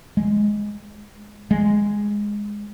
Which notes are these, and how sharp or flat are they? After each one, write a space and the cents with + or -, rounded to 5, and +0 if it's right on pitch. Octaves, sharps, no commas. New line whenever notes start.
G#3 +0
G#3 -5